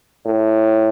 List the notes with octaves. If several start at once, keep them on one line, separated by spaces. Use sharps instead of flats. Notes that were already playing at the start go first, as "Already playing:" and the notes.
A2